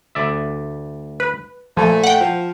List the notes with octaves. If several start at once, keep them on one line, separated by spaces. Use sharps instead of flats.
D2 D5 E5
B4
A#2 F3 A3 G#5
F#5 G5
F3